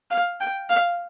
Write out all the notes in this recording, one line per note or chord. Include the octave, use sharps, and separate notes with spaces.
F5
G5
F5